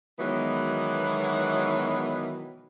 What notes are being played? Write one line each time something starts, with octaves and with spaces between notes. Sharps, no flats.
B2 D#3 E3 F#3 G#3 B3